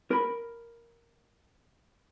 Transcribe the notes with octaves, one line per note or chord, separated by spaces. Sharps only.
A#4 B5